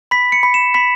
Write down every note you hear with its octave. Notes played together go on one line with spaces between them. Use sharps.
B5 B6
C#7
B5
E7
B5 B6